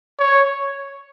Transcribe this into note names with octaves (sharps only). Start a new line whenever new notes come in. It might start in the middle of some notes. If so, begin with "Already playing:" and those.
C#5